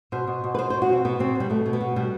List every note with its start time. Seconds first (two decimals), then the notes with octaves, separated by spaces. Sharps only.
0.12 B2 C5
0.27 B2
0.44 B2
0.55 B4
0.59 B2 C5
0.70 B2 C5
0.82 F#4
0.89 B2 C4
1.05 B2 B3
1.19 B2 C4
1.35 B2
1.40 G3
1.50 B2 A3
1.66 B2
1.73 B3
1.81 B2
1.96 B2 G3